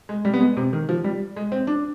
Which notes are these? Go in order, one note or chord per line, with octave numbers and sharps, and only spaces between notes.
G#3
G3
B3
G#3
C3
D#3
F3
G3
G#3
C4
D4